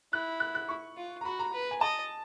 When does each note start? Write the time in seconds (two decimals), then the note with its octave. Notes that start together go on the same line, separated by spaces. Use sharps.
0.13 E4 F#6
0.40 F#6
0.55 F#6
0.69 C#6
0.97 F4
1.21 A#5
1.25 F#4 B5
1.39 A#5
1.53 B4
1.71 G#5
1.81 D#5 A5